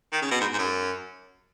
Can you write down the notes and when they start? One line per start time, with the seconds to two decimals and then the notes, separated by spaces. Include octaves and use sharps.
0.12 D#3
0.22 C#3
0.31 B2
0.40 G#2
0.53 G#2
0.58 F#2